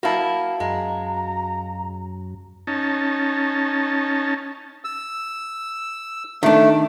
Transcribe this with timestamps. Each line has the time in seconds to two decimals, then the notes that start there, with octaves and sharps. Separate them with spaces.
0.03 A#3 E4 F#4 F5 A5
0.60 F#2 G#3 A#5
2.67 C#4 D#4 A5
4.84 E6
6.43 D#3 A3 D4